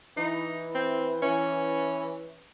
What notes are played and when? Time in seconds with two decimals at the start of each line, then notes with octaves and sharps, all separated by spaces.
0.17 E3 D#4
0.75 C4
1.22 E3 C#4